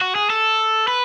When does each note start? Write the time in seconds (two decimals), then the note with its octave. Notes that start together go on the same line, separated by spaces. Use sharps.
0.01 F#4
0.15 G#4
0.30 A4
0.88 B4